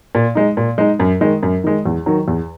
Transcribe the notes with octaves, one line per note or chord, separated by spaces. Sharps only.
A#2
G#3 D#4
A#2
G#3 D#4
F#2
D#3 G#3
F#2
D#3 G#3
E2
D#3 F#3
E2